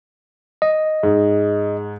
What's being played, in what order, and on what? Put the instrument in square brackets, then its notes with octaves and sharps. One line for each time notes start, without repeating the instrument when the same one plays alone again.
[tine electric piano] D#5
[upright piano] G#2